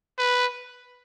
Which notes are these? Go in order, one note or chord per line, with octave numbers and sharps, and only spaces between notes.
B4